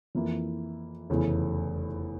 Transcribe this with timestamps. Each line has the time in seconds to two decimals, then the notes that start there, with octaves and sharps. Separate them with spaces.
0.15 F2 E3 A#3 E4
1.10 F1 E2 C#3 E3